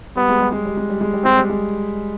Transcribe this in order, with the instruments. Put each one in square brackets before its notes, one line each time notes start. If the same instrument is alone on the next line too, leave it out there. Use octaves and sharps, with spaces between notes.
[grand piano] G3 [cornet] B3
[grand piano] G#3
G3
G#3
G3
G#3
G3
G#3
G3
[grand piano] G#3 [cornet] C4
[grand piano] G3
G#3